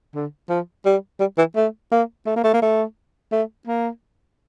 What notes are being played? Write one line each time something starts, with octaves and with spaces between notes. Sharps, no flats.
D3
F3
G3
G3
E3
A3
A#3
A3
A#3
A3
A#3
A3
A3
A#3